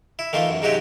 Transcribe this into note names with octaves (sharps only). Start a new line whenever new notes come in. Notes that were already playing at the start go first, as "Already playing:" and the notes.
E4
D#3 E3 A3 A#3 F4
F#2
G#2 C3 F#3 D#4 F#4 G4